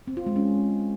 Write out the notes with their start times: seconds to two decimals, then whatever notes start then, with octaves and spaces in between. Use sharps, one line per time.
0.07 C4
0.17 F4
0.26 G#3
0.36 C#4